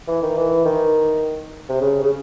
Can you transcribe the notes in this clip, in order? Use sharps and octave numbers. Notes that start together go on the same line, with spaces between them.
E3
D#3
E3
D#3
C3
C#3
C#3